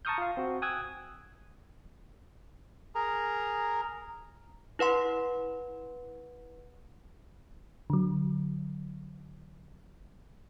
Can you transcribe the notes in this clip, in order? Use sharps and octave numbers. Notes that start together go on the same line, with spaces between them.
A5 A#5 C#6 D#6 F6 G6
F4 F5
C4 F#4
G5 G#5 D#6 E6 F#6 G#6
G#4 A#4 A#5
E4 B4 F#5 C6
D3 F#3